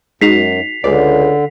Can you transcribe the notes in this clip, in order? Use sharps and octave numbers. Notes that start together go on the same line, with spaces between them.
F#2 G#3 D#4 F#4 B6 C7 F7
C#2 D3 G#3 D5